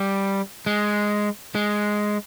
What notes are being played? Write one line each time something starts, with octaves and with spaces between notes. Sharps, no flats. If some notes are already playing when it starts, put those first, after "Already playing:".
Already playing: G3
G#3
G#3